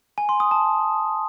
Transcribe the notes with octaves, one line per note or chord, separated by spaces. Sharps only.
G#5
C6
D#6
A5